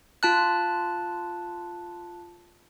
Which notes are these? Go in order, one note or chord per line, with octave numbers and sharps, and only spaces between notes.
F4 A5 F#6